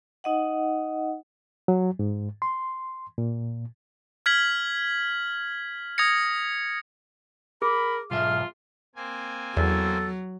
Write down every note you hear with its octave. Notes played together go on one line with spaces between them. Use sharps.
D#4 D#5 F#5
F#3
G#2
C6
A#2
F6 G#6 B6 F#7
D#6 G#6 A#6 C#7
G#4 A#4 B5
B1 G#2 F4 E5 F6
A#3 C4 G#5
E2 F#3 A4